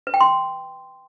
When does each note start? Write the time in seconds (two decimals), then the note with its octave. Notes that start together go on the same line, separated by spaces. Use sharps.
0.07 B4
0.14 G5
0.21 C6